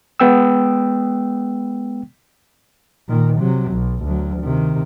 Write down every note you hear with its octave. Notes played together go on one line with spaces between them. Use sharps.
G#3 B3 G5 E6
A#2 D#3
C3 F#3
B1
D2 F#3
C3 D#3